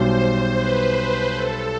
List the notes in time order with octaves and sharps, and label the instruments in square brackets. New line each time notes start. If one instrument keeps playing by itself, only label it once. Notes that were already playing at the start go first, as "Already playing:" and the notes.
Already playing: [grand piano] B1 B2 G3 [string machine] C5
[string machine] C5
B4
B4
A4